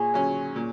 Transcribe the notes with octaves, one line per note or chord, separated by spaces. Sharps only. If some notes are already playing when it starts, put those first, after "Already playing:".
Already playing: A#2 G#4 C#5
F#3 C#4
A#2